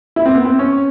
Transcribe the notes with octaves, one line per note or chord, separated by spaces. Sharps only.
E4
C4
B3
C4
C#4